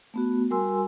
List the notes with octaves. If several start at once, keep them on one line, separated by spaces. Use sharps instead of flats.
A3 B3 F#4
G3 F#4 A#4 G#5 C6 E6